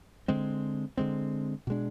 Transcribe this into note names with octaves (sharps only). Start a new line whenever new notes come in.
D3 G#3 C4
D3 G#3 C4
B2 G#3 D4